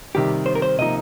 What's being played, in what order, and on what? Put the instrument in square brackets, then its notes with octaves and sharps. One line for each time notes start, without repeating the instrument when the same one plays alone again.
[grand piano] C3 D#3 G3 [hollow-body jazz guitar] G4
[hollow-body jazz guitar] C5
A#4
C5
[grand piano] C3 F3 A#3 D#4 [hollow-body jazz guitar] D#5